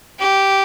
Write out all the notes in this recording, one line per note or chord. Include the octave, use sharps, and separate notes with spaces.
G4